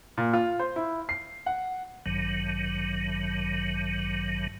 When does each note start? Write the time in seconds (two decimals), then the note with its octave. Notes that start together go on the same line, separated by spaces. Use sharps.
0.18 A#2
0.33 F4
0.59 C5
0.76 E4
1.09 C7
1.46 F#5
2.06 A1 G2 D#3 F#3